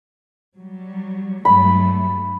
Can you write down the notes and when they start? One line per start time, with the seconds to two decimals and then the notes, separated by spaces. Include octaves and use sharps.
0.58 F#3 G3
1.45 G2 F#3 A3 B5